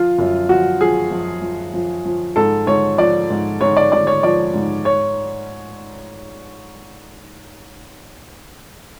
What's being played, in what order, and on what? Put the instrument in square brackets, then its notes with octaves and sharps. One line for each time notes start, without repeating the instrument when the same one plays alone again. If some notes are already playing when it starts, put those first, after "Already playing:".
Already playing: [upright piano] F3 F4
F#2
F3 F#4
F3 G#4
F3
F3
F3
F3
G#2 A4
G#2 C#5
F3 D5
G#2
G#2 C#5
D5
G#2 D5
C#5
F3 D5
G#2
C#5